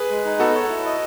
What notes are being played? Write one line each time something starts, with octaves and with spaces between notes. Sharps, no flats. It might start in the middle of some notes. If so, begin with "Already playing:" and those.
Already playing: G#4 B4
G#3
D#4
B3 F#4 A4
C#5
E4
D#5